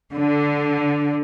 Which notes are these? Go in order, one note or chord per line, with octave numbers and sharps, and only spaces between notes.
D3